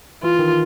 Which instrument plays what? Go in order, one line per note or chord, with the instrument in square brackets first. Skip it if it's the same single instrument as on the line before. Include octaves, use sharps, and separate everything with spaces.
[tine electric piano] E3 [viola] F4
[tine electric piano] D#3